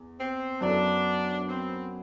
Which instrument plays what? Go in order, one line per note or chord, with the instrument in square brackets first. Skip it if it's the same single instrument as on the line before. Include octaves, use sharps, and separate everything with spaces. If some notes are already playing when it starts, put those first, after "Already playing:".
Already playing: [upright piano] E2
[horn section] C4
[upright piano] F#2 F#3 B3 E4 A4 [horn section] D4
[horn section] C4